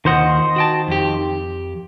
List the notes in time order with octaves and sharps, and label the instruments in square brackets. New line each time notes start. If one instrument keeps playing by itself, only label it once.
[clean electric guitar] D#2 F4 F#5 [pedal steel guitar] D#3 C5 D#5
[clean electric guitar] F#4 G5 A5
F2 G4